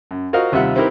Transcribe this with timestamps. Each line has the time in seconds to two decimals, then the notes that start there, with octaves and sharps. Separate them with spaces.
0.11 F#2
0.33 F4 F#4 A#4 C5 D#5 F5
0.52 D#2 C3 G3 F4 E5 F#5
0.76 C4 D#4 E4 G4 A#4 B4